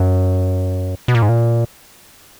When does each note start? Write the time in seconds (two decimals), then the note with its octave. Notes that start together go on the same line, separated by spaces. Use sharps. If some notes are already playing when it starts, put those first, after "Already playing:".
Already playing: F#2
1.08 B2
1.15 A#2
1.22 G#2
1.29 A#2